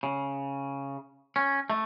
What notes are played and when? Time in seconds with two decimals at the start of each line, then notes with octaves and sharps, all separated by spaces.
0.03 C#3
1.36 C#4
1.70 A3